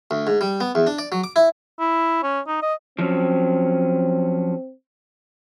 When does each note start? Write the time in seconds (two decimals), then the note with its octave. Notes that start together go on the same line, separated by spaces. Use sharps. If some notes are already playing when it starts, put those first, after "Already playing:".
0.11 D2
0.27 G#2
0.41 G3
0.61 B3
0.75 E2
0.87 D4
0.99 D5
1.12 F#3
1.24 D6
1.36 E4
1.80 E4
2.23 C#4
2.47 D#4
2.62 D#5
2.99 F3 F#3 C4 C#4